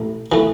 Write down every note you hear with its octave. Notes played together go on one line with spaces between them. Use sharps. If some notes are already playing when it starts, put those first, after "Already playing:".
Already playing: A1 A3
E3 A3